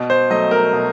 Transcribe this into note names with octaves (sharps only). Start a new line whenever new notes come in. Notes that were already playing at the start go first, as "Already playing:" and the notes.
Already playing: B2
C5
F#3 A3 D#5
A#4
B2